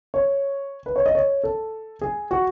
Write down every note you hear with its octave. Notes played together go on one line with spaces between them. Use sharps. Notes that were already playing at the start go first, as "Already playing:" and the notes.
C#5
B4
C#5
D#5
C#5
A4
G#4
F#4